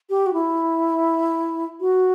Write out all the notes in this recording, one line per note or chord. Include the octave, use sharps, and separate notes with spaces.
G4
F#4
E4
F#4